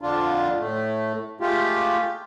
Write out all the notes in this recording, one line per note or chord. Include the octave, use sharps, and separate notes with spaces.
F2 D3 D4 F4
A2 A3
G#3 A3 F4 G4